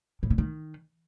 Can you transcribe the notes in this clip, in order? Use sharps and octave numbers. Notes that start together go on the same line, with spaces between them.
A2
C#3
D#3